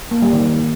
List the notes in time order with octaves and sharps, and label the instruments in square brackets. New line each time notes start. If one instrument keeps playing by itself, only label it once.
[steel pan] A#3
G3
D#3